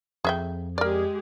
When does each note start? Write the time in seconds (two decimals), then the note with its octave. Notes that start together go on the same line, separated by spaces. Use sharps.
0.25 F2 G#4 E5 G5
0.78 G#3 G4 G#4 A#4 D5